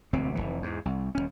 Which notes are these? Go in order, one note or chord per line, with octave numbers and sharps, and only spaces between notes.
E1 D2 C3 C4
F1 A#1 E3
E2 G#2
C2
D#1 F2 C#4